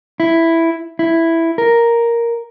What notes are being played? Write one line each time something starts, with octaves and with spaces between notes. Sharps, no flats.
E4
E4
A#4